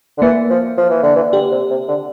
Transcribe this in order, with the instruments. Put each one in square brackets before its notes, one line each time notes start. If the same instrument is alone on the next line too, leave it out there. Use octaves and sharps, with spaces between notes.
[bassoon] D3
[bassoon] E3 [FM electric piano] A#3
[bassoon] F3
F3
E3
D3
E3
[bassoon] D3 [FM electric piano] G4
[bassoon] C3
C3
D3